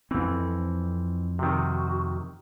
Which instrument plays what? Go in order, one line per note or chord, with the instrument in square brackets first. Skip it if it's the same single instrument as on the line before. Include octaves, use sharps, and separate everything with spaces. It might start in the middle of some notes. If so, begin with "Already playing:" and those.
[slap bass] F2 C4 [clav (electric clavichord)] E3
[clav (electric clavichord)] C3 D#3 [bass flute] F#4